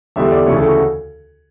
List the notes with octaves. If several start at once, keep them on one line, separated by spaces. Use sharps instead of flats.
E2 D3 G3 E5
D5
D2 C#3 E3 A3 C#5
A4
F#4